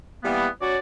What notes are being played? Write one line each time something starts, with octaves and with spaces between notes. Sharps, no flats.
E3 G3 A#3 B3
F#3 C#4 F#4 C#5 D5